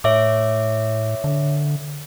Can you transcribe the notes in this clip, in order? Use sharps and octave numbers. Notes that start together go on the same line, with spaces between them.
A2 C#5 E5 D6
D3